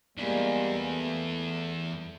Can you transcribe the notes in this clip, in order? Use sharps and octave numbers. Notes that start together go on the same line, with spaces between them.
E2 G3 G#3 A#3
A3